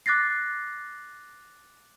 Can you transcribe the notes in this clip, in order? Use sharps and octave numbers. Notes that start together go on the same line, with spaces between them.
D6 F#6 A6 A#6 C7